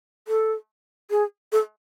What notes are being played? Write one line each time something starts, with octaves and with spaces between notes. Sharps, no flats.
A4
G#4
A4